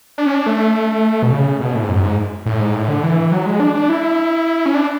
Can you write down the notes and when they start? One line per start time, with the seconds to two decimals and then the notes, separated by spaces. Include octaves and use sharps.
0.18 D4
0.26 C#4
0.34 D4
0.46 A3
1.23 B2
1.32 C#3
1.60 B2
1.75 A2
1.83 G#2
1.89 F#2
2.04 G#2
2.46 A2
2.60 G#2
2.75 A2
2.88 D3
3.03 E3
3.32 F#3
3.46 G#3
3.60 D4
3.75 D4
3.89 E4
4.66 C#4
4.75 D4